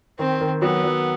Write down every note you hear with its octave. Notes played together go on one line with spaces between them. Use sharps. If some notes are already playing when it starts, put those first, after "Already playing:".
D#3 C4
D#3
F#3 B3
F#3